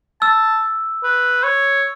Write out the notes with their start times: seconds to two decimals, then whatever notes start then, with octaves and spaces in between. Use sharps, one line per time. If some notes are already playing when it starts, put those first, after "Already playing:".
0.22 A5 E6
1.04 B4
1.44 C#5